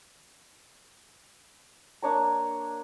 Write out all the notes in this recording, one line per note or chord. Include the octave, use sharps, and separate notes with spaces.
A#3 D4 C#5 A#5